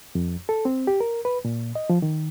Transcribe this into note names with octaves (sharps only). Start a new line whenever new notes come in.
F2
A4
C4
G4
A#4
B4
A#2
D#5
F3
D#3